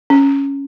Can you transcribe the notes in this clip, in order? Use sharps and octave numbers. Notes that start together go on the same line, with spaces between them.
C#4